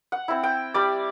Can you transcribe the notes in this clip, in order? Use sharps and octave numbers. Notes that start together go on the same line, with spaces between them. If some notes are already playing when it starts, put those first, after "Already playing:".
F#5
C4 E4
G5
G3 D5